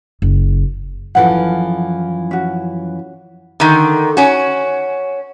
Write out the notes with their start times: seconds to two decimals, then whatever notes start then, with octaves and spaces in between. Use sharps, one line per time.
0.22 F#1
1.15 F#2 E3 F3 A4 B4 F#5
2.31 C#4 F#4
3.60 D3 D#3
4.17 C#4 F#4